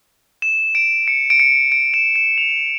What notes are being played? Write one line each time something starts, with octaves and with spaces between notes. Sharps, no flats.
E7
D7
C#7
D7
C#7
D7
E7
E7
F7